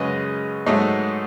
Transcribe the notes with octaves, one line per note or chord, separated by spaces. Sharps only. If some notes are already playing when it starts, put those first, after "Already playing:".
Already playing: F#2 C#3 G#3 B4 D#5
G#2 F#3 A3 D#4